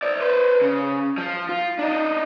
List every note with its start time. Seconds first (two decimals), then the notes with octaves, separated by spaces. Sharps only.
0.03 C5 D5
0.21 B4 C5
0.61 C#3
1.18 F3
1.49 F4
1.79 D4 D#4